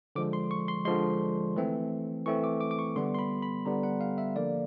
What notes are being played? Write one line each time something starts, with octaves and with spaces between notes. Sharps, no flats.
D3 F3 G#3 D6
C6
C#6
C6
D3 F3 G#3 C6
E3 A3 C4
E3 A3 C4 C#6
D6
D6
D6
C#6
D3 G3 B3 C6
C6
B5
B5
D3 G3 B3 A#5
F#5
F5
E5
D3 F3 A#3 D5